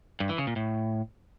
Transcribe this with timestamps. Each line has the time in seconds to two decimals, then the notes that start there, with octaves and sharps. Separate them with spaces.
0.20 G2
0.29 E3
0.38 C#3
0.47 A#2
0.56 A2